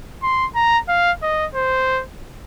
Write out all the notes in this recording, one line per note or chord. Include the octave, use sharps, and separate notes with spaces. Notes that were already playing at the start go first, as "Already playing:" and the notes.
C6
A#5
F5
D#5
C5